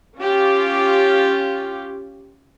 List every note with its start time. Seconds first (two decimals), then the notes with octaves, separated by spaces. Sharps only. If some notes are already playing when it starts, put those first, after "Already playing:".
0.18 C#4 F4 G4